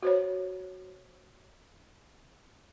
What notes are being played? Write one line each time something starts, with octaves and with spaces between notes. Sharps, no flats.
F#4 C5 C#5